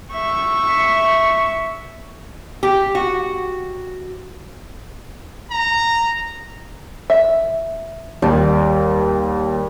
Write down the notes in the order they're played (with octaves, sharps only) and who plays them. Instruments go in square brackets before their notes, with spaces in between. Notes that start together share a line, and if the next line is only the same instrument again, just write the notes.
[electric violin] E5 C#6
[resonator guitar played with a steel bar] G4
F#4
[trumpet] A#5
[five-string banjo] E5
[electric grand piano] D#2 [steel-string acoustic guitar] G3